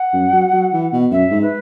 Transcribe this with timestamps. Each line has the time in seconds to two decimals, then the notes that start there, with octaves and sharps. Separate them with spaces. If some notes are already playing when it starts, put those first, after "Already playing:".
Already playing: F#5
0.13 F#2
0.33 F#3
0.53 F#3
0.73 E3
0.93 B2
1.11 F#2 E5
1.31 G#2
1.42 B4